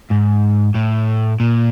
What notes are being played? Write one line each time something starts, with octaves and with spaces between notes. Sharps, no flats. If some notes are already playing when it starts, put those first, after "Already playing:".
G#2
A2
A#2